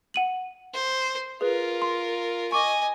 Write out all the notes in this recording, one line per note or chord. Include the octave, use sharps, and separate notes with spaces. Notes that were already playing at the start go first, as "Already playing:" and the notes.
F#5 D#7 F#7
C5
F4 G#4 A#4 B4
C6
D#5 G#5 C#6 D6